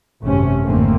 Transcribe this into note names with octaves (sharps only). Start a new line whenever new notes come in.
G#1 F#2 C3 A3 C#4
G#1 F2 D3 A3 A#3 C4